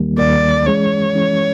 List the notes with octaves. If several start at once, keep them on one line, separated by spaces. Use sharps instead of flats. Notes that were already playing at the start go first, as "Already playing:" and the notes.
Already playing: D#2 D#3 G3 A#3
D#2 D#3 G3 A#3 D5
E3 G#3 C#4 C#5
E3 G#3 C#4